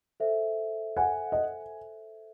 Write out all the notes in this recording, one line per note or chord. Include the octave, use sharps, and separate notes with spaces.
A4 C5 E5
F#5 G#5
D#5